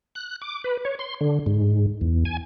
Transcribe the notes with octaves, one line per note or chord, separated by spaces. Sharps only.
F#6
D6
B4
C#5
C6
D3
G#2
E2
G#5